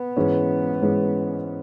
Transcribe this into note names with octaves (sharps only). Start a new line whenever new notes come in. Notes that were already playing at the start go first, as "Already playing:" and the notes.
Already playing: B3
G#2 E3 G#3 C#4
G#2 E3 G#3 C#4